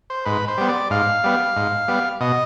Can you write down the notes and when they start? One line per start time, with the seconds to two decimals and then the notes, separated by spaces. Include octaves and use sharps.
0.10 C5
0.25 G#2 B4
0.48 C5
0.58 G3 B3
0.69 D5
0.90 G#2 F5
1.24 G3 B3
1.56 G#2
1.88 G3 B3
2.21 B2 D#5